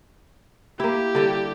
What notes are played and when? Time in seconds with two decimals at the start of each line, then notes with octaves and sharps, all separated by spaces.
0.80 A#3 E4 G4
1.15 D3 G3